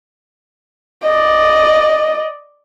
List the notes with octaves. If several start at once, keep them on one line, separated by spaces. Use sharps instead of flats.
D5 D#5